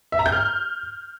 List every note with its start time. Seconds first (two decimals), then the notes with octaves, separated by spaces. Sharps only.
0.12 E5
0.19 A#5
0.26 G6
0.32 F6